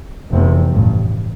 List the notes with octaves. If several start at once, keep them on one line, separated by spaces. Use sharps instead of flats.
F1 E2 C3
A1 G2